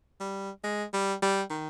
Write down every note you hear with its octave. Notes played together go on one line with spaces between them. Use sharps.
G3
G#3
G3
G3
D#3